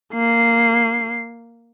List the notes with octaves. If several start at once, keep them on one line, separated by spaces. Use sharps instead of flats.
A#3 C7